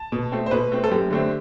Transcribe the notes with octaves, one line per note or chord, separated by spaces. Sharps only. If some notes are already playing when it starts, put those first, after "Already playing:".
Already playing: A5
B2
A3 C4
C5
B2 B4
A3 C4
A4
F#2 G4
D3 A3 C4